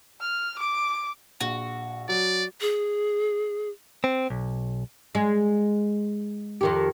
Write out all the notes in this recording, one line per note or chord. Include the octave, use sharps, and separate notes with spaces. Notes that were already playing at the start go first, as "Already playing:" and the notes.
F6
D6
A#1 F#4
F#3 D5
G#4
C4
B1
G#3
F2 D#3 G4